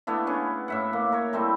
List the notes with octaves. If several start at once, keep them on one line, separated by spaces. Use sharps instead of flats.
A3 B3 D4 E4
B3 C#4 G#4
A2 E5 F#5
A#3
A#4 C#5
G3 A3 C4 E4